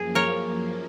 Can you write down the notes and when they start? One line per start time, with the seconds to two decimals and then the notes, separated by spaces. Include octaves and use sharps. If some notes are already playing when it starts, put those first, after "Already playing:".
Already playing: F#2 F3 A#3 G#4
0.15 A#4 C#5